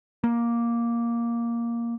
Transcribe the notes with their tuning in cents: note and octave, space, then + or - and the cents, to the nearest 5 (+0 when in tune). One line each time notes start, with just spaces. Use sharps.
A#3 +5